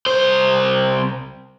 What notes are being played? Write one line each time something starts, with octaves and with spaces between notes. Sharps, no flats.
C2 C5